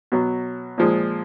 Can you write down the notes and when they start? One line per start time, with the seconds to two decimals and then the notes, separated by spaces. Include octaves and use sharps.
0.12 B2 F#3
0.78 A#2 F3 G#3